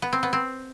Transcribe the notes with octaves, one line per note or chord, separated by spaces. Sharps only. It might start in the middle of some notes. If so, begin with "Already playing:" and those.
B3
C4
B3
C4